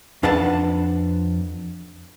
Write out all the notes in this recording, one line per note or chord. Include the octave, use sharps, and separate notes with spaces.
F2 D4 B4 F#5 A5